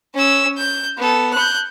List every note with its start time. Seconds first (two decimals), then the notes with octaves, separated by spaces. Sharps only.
0.14 C#4 E6
0.57 G6
0.98 B3 A4
1.33 F#6 G6